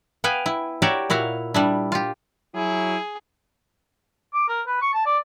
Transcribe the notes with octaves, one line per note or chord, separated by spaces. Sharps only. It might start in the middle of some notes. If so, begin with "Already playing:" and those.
B3 B4 F5 G5 G#5
E4
F#4 G4 A#4 C#5 D5 E5
A#2 E4 F#4 F5
G3 D4 E4
F4 G4
F#3 E4 G#4
D6
A#4
B4
C#6
A5
D5